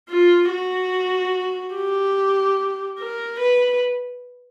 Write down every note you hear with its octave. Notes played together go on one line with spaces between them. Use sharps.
F4
F#4
G4
A#4
B4